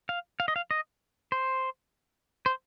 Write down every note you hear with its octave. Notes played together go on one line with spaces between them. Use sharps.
F5
F5
D#5
F5
D#5
C5
C5